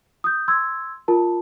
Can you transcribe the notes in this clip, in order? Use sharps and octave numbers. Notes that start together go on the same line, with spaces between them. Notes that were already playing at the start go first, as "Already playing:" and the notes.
D#6 G6
C6 E6 G#6
F4 A#4 A5